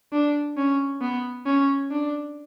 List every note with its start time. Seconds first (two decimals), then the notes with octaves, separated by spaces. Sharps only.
0.12 D4
0.57 C#4
1.01 B3
1.46 C#4
1.91 D4